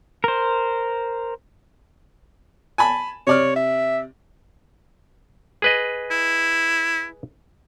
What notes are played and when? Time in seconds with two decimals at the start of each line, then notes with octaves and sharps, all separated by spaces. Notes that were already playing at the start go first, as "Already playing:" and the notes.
0.24 A#4 C5
2.78 G#5 A5 B5
3.27 C3 C#5 D5 F6
3.56 E5
5.62 G#4 B4 D#5
6.11 E4